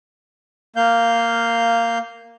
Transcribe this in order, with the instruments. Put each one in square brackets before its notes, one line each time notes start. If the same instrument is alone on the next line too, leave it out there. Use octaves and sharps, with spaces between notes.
[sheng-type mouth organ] A#3 F5 G6